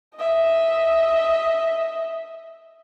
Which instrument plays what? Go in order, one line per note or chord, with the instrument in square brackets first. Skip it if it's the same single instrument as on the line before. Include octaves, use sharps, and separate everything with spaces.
[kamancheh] D#5 E5